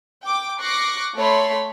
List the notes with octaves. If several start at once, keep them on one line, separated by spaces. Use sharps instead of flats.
G5 D6
C#6 D6 F#6 A#6 C7
A3 C#5 B5 C6